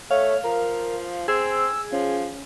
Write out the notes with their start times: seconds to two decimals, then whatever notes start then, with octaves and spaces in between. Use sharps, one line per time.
0.11 A3 C#5 F5
0.44 F3 A#4
1.28 C4 G#4 E6
1.92 F3 C#4